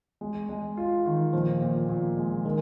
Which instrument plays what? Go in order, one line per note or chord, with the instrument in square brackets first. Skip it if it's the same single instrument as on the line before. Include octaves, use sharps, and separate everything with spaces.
[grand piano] G#3
G#3
F4
D#3
[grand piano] A#2 [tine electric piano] F3
[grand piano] A#2
A#2
G#3
[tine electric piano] D#3 [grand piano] G#3